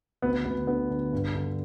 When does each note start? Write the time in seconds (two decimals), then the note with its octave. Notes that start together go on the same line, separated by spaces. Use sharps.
0.22 D2 B3
0.45 D2 B3
0.67 D3 B3
0.90 D3
1.13 G2
1.35 D3